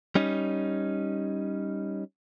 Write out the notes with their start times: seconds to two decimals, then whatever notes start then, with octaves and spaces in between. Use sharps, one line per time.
0.15 G3 C#4 D#4